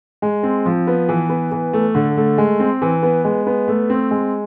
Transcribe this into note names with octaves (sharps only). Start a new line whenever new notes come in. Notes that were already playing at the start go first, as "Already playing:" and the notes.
G#3
C4
F3
B3
E3
B3
E3
A3
D3
A3
G#3
C4
E3
B3
G#3
B3
A3
C4
G#3